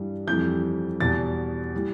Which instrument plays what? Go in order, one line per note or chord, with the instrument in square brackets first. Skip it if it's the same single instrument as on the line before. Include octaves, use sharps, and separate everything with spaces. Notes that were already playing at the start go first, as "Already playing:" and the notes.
Already playing: [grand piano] G2 E3 G3
F2 E3 G3 G6
E2 B2 G3 A6
E3 G3